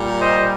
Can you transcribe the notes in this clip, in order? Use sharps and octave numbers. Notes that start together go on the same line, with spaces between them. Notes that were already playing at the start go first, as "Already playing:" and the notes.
Already playing: A#2 G3
C5 D#5